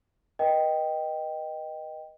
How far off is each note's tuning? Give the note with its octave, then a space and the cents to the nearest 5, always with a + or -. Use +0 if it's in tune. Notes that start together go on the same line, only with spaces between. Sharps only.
B4 -40 D#5 -5 G5 +0